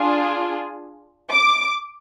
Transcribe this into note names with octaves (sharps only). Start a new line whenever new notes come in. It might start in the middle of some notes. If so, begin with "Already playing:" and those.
Already playing: D4 F4 G#4
D6